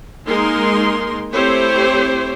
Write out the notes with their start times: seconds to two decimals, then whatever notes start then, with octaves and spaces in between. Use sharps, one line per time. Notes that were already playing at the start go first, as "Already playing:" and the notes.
0.27 G#3 A#3 D#4 A#4 C6
1.33 A3 C4 E4 G4 C5 C#5